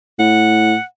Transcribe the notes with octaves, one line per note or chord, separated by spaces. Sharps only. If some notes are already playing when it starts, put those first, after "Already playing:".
A2 F#5